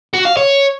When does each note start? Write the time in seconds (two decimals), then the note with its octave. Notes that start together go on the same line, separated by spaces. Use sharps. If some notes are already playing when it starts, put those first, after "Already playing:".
0.13 F#4
0.25 F5
0.37 C#5